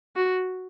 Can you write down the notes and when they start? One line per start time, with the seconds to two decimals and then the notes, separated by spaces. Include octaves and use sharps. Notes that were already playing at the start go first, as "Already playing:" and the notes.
0.16 F#4